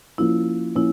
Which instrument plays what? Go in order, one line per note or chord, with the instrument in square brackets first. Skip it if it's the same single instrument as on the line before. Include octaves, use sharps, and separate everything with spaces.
[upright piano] F3 A#3 C#4 [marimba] E4
[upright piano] F3 A#3 C#4 [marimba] E4